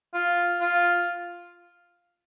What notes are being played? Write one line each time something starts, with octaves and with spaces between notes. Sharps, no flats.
F4
F4